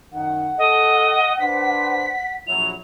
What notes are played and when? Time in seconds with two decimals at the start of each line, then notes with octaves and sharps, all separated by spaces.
0.13 F#2 D#3 F#5
0.58 A4 D#5
1.40 D4 B4 C5 B6
2.47 A#1 F#3 E4 F7